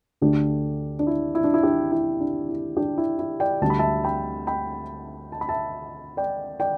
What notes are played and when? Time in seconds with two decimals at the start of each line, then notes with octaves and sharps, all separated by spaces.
0.21 D2 D3 A3 D4 G4
0.99 D4
1.07 E4
1.35 E4
1.44 D4
1.54 E4
1.63 D4 G4
1.92 E4
2.20 D4
2.49 E4
2.77 D4 G4
2.98 E4
3.19 E4
3.40 D5 G5
3.61 D2 D3 G3 A5
3.70 B5
3.79 E5 A5
4.04 G5 B5
4.47 G5 B5
5.32 A5
5.41 B5
5.49 E5 A5
6.17 D5 G5
6.60 D5 G5